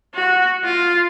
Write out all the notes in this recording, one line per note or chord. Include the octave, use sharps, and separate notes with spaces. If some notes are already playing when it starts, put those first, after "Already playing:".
F#4
F4